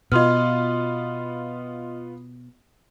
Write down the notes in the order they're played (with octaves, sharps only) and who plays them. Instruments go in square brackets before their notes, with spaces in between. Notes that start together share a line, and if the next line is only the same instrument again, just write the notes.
[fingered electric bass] B2 [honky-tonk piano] B3 F4 [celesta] D#5 C6 F6